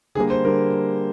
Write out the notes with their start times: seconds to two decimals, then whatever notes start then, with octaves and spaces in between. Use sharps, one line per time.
0.15 D3 G#4
0.18 G3 A#3
0.30 C5
0.44 D3 G3 A#3 A#4